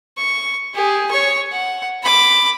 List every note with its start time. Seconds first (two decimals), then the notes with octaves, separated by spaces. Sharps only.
0.18 C#6
0.74 G4 G#4
1.11 C#5 C#6
1.51 F#5
2.03 B5 D6